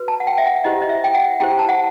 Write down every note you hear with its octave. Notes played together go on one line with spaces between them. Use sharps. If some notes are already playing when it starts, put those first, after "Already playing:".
Already playing: F#4 B4
A5
F#5
G5
E5
F#5
E4 G4 C5 D#5
D#5
E5
G5
F#5
E4 G4 C5 G5
A5
F#5